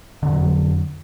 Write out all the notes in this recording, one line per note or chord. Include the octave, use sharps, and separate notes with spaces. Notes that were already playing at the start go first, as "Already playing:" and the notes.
F2 D3 F#3